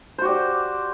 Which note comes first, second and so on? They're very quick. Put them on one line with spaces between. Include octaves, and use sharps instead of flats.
C5 F#4 G4 D5